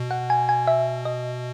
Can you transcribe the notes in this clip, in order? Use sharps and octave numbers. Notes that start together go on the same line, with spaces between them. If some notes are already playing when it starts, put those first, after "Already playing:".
Already playing: B2
F#5
G#5
G#5
E5
D#5